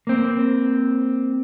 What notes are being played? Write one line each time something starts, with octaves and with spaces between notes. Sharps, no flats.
A#3 C4